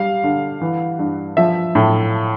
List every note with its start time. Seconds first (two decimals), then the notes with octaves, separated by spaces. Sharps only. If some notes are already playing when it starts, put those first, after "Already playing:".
Already playing: G3 F5
0.24 D3
0.61 E3
0.99 G2
1.37 F3 E5
1.75 A2